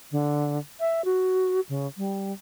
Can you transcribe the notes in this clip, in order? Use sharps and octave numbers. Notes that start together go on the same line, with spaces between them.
D3
E5
F#4
C#3
G3